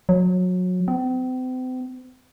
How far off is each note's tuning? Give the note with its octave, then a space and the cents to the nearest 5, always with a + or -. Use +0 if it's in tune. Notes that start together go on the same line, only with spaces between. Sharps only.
F#3 -25
C4 -40